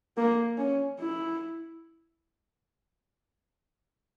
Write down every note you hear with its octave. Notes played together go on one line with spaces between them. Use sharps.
A#3
C#4
E4